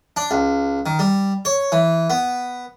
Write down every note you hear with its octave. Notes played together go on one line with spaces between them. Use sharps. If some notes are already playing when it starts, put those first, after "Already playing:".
D4
C#2
D#3
G3
C#5
E3
B3